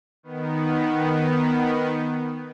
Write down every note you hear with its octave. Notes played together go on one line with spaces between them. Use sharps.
D#3 B3